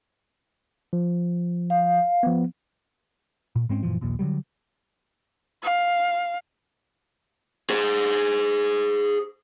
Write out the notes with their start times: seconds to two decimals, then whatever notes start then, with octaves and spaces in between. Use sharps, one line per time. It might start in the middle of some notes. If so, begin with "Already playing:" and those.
0.93 F3
1.70 F5
2.23 F3 B3
3.56 A#2
3.69 G#2 G#3 C4 C#4
3.83 F#2 A#2 E3 F3
4.01 A#1 D#2 A#2
4.19 D3 D#3 F#3 G3
5.63 F5
7.70 G#4 C5